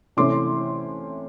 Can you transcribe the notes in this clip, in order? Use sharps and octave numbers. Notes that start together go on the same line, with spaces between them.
C3 E3 A3 C#4 C6 D6